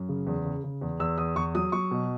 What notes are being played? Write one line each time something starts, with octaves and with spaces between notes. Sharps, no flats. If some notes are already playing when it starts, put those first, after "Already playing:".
Already playing: F#2
C#3
E2
C#3
C#3
E2
E2 E6
E2 D#6
E2 C#6
F#3 D#6
F#3 C#6
B2